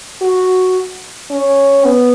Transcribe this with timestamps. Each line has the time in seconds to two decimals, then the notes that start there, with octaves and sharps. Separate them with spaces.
0.21 F#4
1.30 C#4
1.85 B3